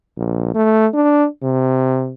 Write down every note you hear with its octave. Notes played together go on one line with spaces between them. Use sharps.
A#1
A3
D4
C3